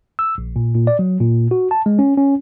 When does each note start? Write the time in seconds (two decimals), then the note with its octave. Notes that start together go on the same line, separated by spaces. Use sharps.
0.19 E6
0.38 A#1
0.56 A#2
0.75 A#2
0.87 D5
0.99 F#3
1.20 A#2
1.51 F#4
1.71 A5
1.86 G#3
1.99 C#4
2.17 C#4